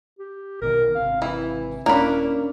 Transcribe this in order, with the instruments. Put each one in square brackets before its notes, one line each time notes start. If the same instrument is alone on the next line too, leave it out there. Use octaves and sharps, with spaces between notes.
[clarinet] G4
[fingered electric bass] B1 B2 D#3 [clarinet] A#4
[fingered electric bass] G#1 C3 [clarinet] F5
[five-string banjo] E3 [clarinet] E4
[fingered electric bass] D#1 [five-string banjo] A#3 B5 [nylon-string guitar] C#4 D4 [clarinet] E4